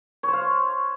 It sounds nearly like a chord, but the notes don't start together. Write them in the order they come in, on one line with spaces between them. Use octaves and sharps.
C#5 C5 F5